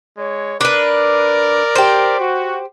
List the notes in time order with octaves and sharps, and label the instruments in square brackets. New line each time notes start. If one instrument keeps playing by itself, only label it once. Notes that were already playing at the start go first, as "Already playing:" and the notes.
[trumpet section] G#3 C#5
[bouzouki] D4 B4 [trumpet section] A#4 D5
[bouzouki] G4 C5
[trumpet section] F#4